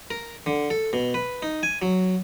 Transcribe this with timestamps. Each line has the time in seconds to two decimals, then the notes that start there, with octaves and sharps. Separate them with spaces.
0.11 A#4
0.46 D3
0.70 A4
0.93 B2
1.14 B4
1.42 D#4
1.63 G#5
1.82 F#3